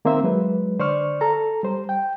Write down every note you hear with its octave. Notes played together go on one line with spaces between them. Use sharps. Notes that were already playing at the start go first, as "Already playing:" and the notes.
D#3 A#3 C4 C5 E5
F#3 G#3 B4
D3 C5 D5 C#6 F6
A4 A#5
G3 C5
G5